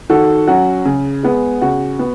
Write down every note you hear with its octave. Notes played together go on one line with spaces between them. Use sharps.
D#3 F#4 A4
F#3 C#4 F#4
C#3 G#4
G#3 B3
C#3 F#4
B3